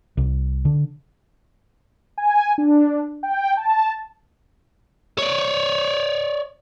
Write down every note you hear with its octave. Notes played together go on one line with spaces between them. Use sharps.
C2
D3
G#5
D4
G5
A5
C#5 D5